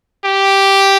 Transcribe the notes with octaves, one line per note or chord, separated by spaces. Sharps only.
G4